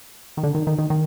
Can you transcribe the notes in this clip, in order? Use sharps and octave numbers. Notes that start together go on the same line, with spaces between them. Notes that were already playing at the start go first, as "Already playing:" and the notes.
D#3
D3
D#3
D#3
D#3
D#3